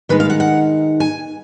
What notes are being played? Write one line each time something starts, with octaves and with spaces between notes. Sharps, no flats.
D#3 G#3 D#4 B4
F5
F#5
F#5
G#5